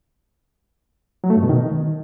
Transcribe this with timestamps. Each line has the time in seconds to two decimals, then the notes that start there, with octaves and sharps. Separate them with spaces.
1.24 F#3
1.30 A3
1.36 G2
1.43 B2
1.49 D#3